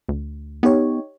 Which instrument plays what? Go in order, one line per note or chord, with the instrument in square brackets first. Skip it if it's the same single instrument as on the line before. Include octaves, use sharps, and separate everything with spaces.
[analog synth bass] D2
[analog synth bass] B3 [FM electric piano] D#4 G4 C#5